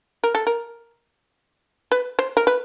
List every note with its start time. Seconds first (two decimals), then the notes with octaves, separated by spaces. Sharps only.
0.24 A#4
0.35 A4
0.47 A#4
1.92 B4
2.19 C5
2.37 A#4
2.47 B4